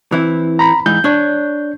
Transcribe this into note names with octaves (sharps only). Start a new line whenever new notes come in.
E3 C4 E4
A#5 B5
G#2 E3 D#4 G6
D4 C#5